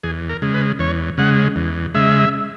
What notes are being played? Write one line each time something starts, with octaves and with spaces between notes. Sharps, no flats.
E2 G#4
A#4
C#3 G#3
B4
E2 C#5
C#3 G#3 F#5
E2
C#3 G#3 E5